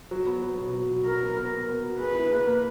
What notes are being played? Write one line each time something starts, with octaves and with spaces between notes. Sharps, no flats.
F#3
B3
F#3
B2
F#3
F#4
F#4 A#4
B3
B3
B3
B3
F#4
G#4 B4
E4
A#3
A#3